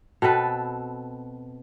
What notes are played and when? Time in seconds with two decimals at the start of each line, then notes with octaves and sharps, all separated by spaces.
0.22 B2 C4 A4 B4